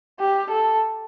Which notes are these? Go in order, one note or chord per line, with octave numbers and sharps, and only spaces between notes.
G4
A4